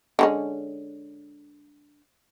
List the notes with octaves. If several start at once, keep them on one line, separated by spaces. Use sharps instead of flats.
D3 G#3 C#4